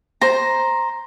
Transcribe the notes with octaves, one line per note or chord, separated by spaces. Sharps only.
C5 A#5